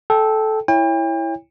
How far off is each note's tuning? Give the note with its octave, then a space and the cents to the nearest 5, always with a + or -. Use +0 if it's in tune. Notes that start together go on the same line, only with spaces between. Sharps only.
A4 -15 G5 +0
E4 +0 C#5 +0 G5 +40